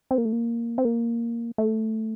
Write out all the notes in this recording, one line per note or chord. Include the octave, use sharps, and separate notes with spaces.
C4
A#3
A3
A#3
C4
A#3
A3